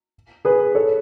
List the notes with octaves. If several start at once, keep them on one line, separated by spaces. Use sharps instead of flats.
G#4 B4
A4 C#5